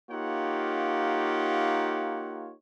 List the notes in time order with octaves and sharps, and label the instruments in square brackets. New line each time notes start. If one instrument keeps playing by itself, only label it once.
[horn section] A#3 D#4 F4 G4 C#5 F#5